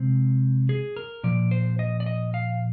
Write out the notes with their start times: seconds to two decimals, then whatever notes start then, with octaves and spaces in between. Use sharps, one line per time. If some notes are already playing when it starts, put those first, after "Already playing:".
Already playing: C3 G#3 C4
0.69 G#4
0.96 A#4
1.23 A#2 F3 D5
1.51 C5
1.79 D#5
2.00 D5
2.06 D#5
2.34 F5